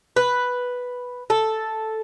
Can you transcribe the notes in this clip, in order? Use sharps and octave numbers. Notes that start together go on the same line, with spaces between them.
B4
A4